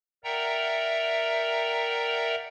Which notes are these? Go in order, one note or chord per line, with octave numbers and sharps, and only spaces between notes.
A#4 D5 E5 F#5 G5 A#5